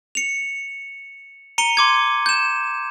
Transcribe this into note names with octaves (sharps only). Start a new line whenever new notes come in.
C#7 F7
A#5 C#7 D#7 G7
C6 D6 G#6
G6 E7